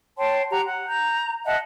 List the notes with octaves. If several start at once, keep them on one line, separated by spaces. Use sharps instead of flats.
C#5 G5 A5 C6
G4 F#5 A#5
F#5
A#5 G6
D#5 E5 F#5 A5